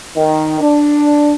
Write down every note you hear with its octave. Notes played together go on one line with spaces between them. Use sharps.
D#3
D4